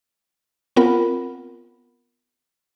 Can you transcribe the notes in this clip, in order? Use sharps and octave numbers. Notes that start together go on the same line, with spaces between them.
B3 C4 F4 A#4 F#5 B5